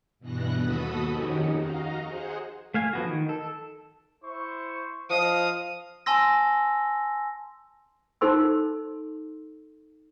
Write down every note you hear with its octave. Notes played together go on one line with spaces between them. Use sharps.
G2 B2 E3 B3 F#6 A#6
D#2 F#4 A4 B5 D#6
F2 D#3 C#4 D#4 F#4 G4
F#4 D#5 F5 A#5
G#4 C5 F#5
A3 F5 G#5
F3 B3 F#4
D#3
A4
E4 C5 C#6
F3 D#5 F5 D#6
G#5 A5 C6 E6 A#6
D#4 A4 C5 C6 E6